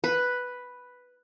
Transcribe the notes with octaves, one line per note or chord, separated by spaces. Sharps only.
B4